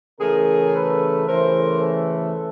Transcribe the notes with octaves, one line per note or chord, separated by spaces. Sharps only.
C#3 E3 A3 G#4 A#4
A4 B4
C#3 E3 A3 A#4 C5
A4 B4